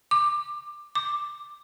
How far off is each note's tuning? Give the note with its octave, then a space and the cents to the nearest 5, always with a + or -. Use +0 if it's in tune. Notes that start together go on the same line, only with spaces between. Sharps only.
D6 +15
D6 +5